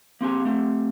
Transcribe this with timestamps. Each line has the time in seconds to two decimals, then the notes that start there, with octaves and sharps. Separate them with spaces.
0.21 A#3 C4 G4 G#5
0.45 A3 C4 G4